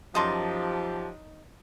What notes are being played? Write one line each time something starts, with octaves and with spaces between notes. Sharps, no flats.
F#2 F3 D#4 G4 A5 C6 D6 D#6